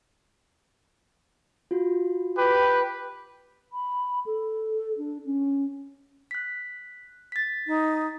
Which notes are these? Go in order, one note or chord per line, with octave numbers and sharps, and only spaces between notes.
F4 F#4
G4 B4
B5
A4
D4
C#4
F#6 B6
A6 B6
D#4